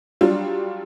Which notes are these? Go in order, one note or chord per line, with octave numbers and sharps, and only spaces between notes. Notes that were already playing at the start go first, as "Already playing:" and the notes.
F#3 G3 D4 F4